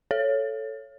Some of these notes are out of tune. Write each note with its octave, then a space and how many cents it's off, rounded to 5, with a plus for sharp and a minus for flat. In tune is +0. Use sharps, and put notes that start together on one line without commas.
A4 +0 C#5 +0